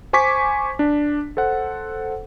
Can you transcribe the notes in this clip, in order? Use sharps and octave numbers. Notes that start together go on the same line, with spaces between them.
C5 G#5 C#6 D6 B6
D4
A4 C5 F#5